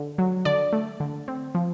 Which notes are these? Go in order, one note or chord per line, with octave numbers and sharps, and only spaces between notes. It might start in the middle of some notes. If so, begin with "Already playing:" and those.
Already playing: D3
F#3
D3 D5
A3
D3
C4
F3